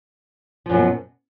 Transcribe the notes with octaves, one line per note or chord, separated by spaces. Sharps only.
F#2 B2 F3